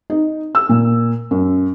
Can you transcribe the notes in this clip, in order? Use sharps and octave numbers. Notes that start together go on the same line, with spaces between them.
D#4
E6
A#2
F#2